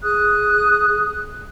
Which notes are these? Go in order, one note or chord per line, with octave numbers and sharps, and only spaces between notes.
G#4 D#6 F#6